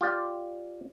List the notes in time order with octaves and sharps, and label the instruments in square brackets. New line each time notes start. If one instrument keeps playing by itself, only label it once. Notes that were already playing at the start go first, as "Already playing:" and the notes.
[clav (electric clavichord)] F4 G4 D5